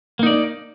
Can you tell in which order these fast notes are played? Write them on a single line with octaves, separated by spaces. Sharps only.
A#3 D#4 D5